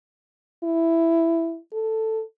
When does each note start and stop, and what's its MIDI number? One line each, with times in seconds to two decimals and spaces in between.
0.64 1.58 64
1.73 2.22 69